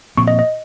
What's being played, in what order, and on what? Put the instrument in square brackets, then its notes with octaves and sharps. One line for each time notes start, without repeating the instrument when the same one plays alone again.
[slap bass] A#2 F3 C4 [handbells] C#6
[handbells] D#5
D#5